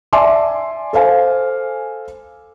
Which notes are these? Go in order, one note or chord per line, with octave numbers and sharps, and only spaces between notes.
D5 E5 G#5 A5 C6 D6
A4 C5 F5 G#5